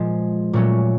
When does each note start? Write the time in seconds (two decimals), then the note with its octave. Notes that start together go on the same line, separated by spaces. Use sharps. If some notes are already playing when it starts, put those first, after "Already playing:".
Already playing: A#2 F3 G#3
0.53 A#2 F#3 A3 C#4